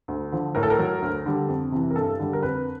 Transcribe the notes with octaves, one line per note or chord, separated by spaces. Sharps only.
D2
D3 F3
A2 A#4
A4
A#4
F#3
D2
D3 G3
F2
C3 E3
A#4
G2 A4
D3 G3
A#4
F2 B4